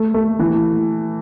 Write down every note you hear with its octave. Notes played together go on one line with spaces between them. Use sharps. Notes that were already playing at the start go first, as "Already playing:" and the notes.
Already playing: A3
A3
E3